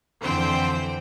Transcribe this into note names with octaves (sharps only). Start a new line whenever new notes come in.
F2 D3 E3 C4 C5 G5